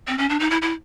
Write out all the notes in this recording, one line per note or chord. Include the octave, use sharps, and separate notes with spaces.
C4
C#4
D4
D#4
E4
E4